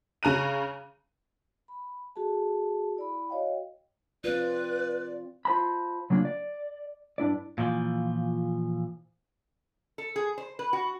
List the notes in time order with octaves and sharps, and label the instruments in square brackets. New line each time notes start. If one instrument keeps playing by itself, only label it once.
[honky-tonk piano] C#3 A#5 F#6 D#7
[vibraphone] B5
F#4 G#4 A4 A5
E4 D5 B5
F#4 C#5 D#5 F5 G5
[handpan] C4 F4 [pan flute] B4 [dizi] D5
[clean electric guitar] F4 C5 A5 B5
C#3 F#3 A#3 D4 F4
D5
G2 D4 E4 D5
A#2 E3 F3
[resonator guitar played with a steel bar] A4
G#4
C5
B4
F#4